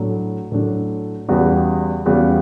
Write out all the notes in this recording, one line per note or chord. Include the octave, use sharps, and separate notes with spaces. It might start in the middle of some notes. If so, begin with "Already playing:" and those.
Already playing: A2 F#3 A3 D4
A2 F#3 A3 D4
E2 C#3 G3 B3 F#4
E2 C#3 G3 B3 F#4